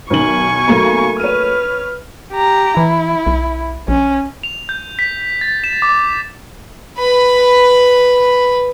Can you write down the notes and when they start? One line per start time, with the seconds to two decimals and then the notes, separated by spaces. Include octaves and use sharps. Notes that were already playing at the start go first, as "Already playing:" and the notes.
0.10 B1 D#3 G#5 C#6 F#7
0.68 B1 F#3 A3 A#3 F5 A#5
1.20 B4 C#5 F6 D#7
2.32 G4 A#5
2.77 E3 E4
3.27 B1
3.88 A#1 C#4
4.43 F7
4.69 G6
4.99 B6
5.41 A6
5.64 E7
5.82 D6
6.99 B4 B5